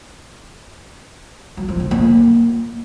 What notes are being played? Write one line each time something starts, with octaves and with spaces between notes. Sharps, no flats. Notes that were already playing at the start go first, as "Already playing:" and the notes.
F#3
F3
D3
A#3